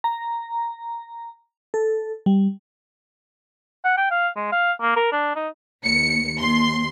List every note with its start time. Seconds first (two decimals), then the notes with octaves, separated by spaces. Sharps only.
0.04 A#5
1.74 A4
2.26 G3
3.84 F#5
3.97 G5
4.11 F5
4.36 G#3
4.52 F5
4.81 A#3
4.96 A#4
5.12 D4
5.35 D#4
5.83 D#2 C#7
6.39 D#2 C6